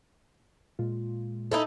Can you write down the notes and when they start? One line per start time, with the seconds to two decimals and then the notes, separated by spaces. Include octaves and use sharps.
0.79 A#2 G#3 F4
1.51 D#4 E4 A4